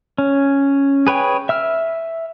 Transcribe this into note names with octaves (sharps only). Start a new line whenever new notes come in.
C#4
G#4 B4 C#5 G5 G#5
E5 E6 F6